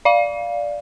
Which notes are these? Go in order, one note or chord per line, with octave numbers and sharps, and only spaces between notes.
D5 F5